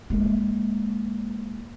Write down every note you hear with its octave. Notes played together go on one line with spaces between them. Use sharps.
G#3 A#3